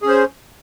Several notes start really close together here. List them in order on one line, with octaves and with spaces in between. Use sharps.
G#4 C#4 C5